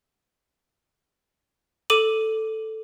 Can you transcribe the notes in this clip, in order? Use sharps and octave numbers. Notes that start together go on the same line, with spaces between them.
A4 D6 D#7 F#7